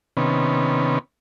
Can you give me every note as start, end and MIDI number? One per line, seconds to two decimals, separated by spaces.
0.17 0.99 48
0.17 0.99 51
0.17 0.99 59
0.17 0.99 61